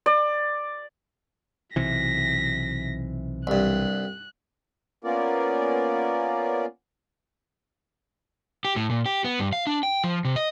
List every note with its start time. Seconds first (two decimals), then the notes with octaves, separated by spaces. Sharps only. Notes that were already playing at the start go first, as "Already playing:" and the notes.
0.06 D5
1.76 B1 C3 E3 A#6 B6
3.47 C2 G2 F#6
5.04 A#3 B3 C#4 F4 A#4 D5
8.65 G4
8.76 A2
8.90 A#2
9.06 G4
9.24 B3
9.40 G2
9.53 F5
9.67 D4
9.83 G5
10.04 F3
10.25 C3
10.36 D#5